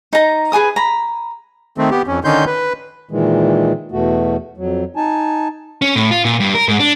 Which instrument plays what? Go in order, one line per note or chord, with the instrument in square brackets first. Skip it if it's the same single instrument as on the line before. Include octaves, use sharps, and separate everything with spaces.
[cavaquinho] D#4 A#5
G#4 B4 G#5 D#6
A#5 B5
[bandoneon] D#3 A3 C4
B3 G4
F2 C#4
D3 D#3 C#4 D#4 C6 G6
B4
[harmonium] A#2 D#3 E3 G#3
E2 B2 A3 F#4
F2 F#3
D#4 G#5 A5
[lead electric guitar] C#4
A2
F4
A#2
G2
A#4
G#2
D4